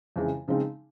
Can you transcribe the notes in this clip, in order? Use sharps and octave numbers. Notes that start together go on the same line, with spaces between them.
F2 C#3 E3 G#3
C#3 F3 G#3 C4 D#4